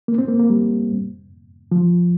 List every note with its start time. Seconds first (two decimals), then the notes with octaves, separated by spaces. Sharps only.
0.08 A#3
0.18 C4
0.29 A#3
0.39 A#3
0.50 G3
1.72 F3